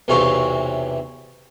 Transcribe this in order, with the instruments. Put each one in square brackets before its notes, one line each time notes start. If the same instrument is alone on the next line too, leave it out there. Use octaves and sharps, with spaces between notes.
[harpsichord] B1 E2 C3 E3 C#5 F5